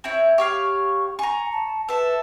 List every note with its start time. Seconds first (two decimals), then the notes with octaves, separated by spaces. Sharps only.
0.04 C4 E4 C#5
0.38 G4 C#5 F5 C#6
1.19 G#5 A#5 C#6
1.52 A5
1.89 A4 B4 E5